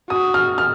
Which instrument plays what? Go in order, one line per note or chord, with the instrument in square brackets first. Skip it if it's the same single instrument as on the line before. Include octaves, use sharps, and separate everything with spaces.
[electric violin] F#4 [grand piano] D#6
[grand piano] F6
F6